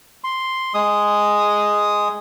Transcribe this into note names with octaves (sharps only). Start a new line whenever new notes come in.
C6
G#3 D#6